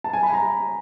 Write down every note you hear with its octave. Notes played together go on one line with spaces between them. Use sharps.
A5
G#5
B5
A#5